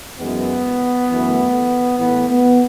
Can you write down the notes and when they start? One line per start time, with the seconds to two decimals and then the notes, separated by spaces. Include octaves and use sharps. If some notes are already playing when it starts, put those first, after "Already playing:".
0.19 F#2 E3 G#3 B3
1.09 F#2 E3 A3
1.98 A2 E3 A3 B3
2.28 B3